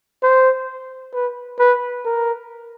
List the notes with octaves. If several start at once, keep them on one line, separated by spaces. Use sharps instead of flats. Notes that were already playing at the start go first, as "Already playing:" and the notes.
C5
B4
B4
A#4